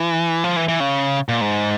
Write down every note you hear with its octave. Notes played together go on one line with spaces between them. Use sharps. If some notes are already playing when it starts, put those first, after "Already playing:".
Already playing: E3
F3
E3
E3
C#3
A#2
G#2